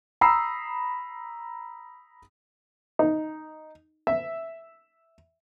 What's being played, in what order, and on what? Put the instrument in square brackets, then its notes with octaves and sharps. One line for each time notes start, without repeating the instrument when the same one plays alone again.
[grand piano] A#5 B5 D#6 E6 C7
[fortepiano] D#4
E5